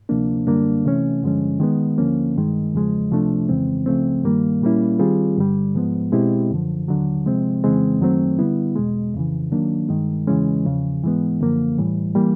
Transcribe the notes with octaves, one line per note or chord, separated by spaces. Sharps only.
D2 C3 F3 A#3 D4
F#2 D3 G3 A#3 D4
C3 E3 A3 C#4
G2 D3 F3 G#3 C#4
D#3 G#3 B3
D2 D3 F3 A#3 C#4
G2 D#3 G#3
E2 C#3 F3 G#3
C#2 C3 F3 A3 D4
F2 C#3 E3 G#3 C4
C#2 C#3 F3 A3 C4
G2 D#3 G3 A#3
A#2 G3 A#3 C#4 E4
D#3 G3 C4 F4 G#4
G2 D3 G3
G#2 F3 G#3 B3
B2 G#3 C4 E4 G4
F#2 D3 F3
D#2 D3 F#3
C3 F3 G#3 C4
F2 C#3 E3 G#3 C4
F#2 D#3 F#3 A3 C4
D3 G3 B3 E4
E2 B2 G#3
F2 C#3 E3
D#3 F#3 A#3 D4
G2 D#3 G#3
E2 C#3 E3 G#3 C#4
E2 C#3 F3
G#2 E3 G#3 B3
F#2 D3 F3 A#3
A2 E3 G3
E3 G3 A#3